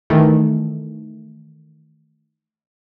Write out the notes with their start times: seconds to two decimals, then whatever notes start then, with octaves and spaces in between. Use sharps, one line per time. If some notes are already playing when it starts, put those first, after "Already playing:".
0.10 D#3 E3 A3